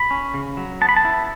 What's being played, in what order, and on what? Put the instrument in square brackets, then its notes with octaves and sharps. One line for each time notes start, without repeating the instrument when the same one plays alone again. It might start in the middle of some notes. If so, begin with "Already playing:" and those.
Already playing: [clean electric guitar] B5
C#4
C#3
F#3
B3 A5
B5
A5
E4